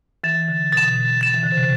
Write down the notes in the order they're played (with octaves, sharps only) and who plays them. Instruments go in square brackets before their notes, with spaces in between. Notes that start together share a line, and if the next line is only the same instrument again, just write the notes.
[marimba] E3 [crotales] A6 E7
[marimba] D3
[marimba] B2 [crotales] A6 E7
[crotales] A6 E7
[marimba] E3
D3
C3